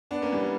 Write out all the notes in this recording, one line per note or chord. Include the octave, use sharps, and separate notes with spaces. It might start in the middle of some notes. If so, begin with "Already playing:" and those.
B3 D4
A#3 C#4
E3 G3